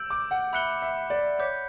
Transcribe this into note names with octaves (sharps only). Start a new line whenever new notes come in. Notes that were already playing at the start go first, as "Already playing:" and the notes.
Already playing: E6 G6 D7 F#7
D6
F#5
E5 B5 F#6 C#7 G7
E5
D5
C#5 D6 G6 B6